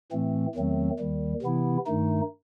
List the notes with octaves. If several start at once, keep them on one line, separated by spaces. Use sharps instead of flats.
A2 E3 A3 C4
E2 D#3 F#3 A3 C4
D#2 D#3 G3
C3 E3 B3 E4
G2 D#3 A3 D#4